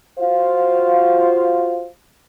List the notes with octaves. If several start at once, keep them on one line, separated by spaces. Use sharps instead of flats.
F4 F#4 C5 F5